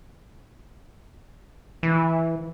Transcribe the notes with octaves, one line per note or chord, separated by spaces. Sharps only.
E3